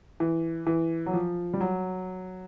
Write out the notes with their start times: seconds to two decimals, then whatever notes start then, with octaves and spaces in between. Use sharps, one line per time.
0.20 E3
0.67 E3
1.06 F#3
1.13 F3
1.53 G3
1.60 F#3